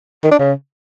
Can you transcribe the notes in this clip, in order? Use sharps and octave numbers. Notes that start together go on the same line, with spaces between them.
D#3
D4
C#3